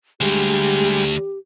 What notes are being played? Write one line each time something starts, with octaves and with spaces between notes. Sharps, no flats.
D2 G3 G#3 G4